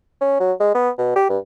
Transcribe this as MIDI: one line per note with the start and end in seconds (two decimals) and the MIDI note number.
0.21 0.37 61
0.40 0.53 54
0.60 0.73 56
0.75 0.90 59
0.98 1.13 47
1.16 1.25 67
1.29 1.38 43